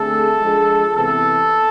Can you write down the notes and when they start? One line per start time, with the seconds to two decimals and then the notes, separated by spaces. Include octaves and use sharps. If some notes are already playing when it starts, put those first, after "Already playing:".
Already playing: D3 A3 C4 G#4 A4
0.40 F3 G#3 D4 G#4
0.96 C3 E3 B3 A4